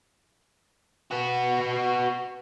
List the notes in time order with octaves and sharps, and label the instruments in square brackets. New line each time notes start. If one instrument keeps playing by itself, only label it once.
[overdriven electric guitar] B3 F#4